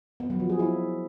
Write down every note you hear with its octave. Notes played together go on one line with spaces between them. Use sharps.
B3
F#3
F3
G#4
E4